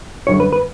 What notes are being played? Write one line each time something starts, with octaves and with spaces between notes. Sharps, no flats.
F#2 D3 G3 C#4 C#5
B4
B4